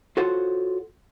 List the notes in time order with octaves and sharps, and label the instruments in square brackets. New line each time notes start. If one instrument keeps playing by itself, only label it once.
[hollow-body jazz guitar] F4 F#4 A4 C5 C#5 F#5